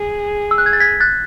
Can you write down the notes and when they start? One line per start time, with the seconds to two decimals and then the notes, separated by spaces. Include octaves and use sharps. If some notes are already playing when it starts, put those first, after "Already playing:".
Already playing: G#4
0.51 E6
0.58 F#6
0.66 G#6
0.73 A6
0.80 G#6 B6
1.00 F#6 A6